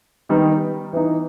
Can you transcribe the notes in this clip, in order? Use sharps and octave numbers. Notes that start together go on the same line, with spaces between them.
D#3 G3 B3 D#4
E3 B3 D#4